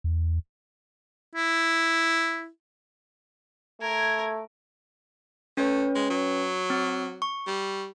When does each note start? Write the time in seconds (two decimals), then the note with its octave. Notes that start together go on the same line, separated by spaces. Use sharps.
0.04 E2
1.36 E4
3.81 A3 A#4 G#6
5.57 A3 C#4 B4 C#5
5.95 G#3
6.10 F#3
6.70 C4
7.22 C#6
7.47 G3